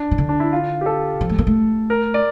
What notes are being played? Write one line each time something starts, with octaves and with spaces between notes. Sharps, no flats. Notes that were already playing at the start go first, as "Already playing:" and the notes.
Already playing: D4
E3
D3
D4
E4
F4
G4
A4
F3
A3
A#3
A3
A#4
D5